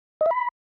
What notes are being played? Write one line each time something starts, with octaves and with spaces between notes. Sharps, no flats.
D#5
E5
B5